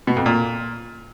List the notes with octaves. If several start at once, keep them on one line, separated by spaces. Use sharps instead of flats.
B2
F2
A#2